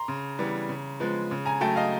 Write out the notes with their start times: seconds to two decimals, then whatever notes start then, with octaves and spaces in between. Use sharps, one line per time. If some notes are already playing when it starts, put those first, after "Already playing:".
Already playing: A#5 C6
0.08 C#3
0.38 E3 G3 B3
0.69 C#3
1.00 F3 G#3 B3
1.31 C#3
1.46 G#5 A#5
1.61 F#3 A3 G5 A5
1.76 D#5 F5